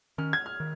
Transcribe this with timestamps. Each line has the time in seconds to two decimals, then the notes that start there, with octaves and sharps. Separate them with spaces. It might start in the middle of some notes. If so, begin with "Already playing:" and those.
0.18 D#3 C#4 F6
0.33 G#6
0.46 F6
0.60 D#3